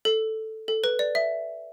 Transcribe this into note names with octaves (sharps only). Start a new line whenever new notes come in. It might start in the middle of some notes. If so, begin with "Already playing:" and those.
A4
A4
B4
D5
E5